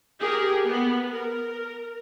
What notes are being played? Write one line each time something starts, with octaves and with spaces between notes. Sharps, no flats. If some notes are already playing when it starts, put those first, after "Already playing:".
G4 G#4 A#4
B3
A#4